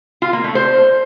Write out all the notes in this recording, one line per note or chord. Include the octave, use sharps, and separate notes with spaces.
F4
A#3
A3
C5